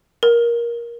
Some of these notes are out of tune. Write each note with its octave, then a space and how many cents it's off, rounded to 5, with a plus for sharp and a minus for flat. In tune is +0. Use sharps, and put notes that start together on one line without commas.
A#4 +15